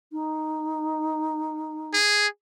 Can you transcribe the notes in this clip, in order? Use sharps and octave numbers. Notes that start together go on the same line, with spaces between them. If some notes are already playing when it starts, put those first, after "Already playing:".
D#4
G#4